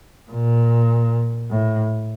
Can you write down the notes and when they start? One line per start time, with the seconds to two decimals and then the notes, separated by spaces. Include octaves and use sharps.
0.32 A#2
1.50 A2